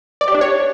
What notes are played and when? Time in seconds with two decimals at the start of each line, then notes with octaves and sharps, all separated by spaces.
0.21 D5
0.28 G4
0.34 D4
0.41 C#5